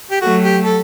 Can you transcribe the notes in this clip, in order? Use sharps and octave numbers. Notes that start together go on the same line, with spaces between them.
G4
F#3 A3 F#4
G4
A4